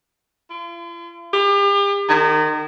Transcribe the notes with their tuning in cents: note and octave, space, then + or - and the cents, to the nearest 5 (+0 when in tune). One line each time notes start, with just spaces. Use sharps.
F4 -45
G4 +40
D#3 -25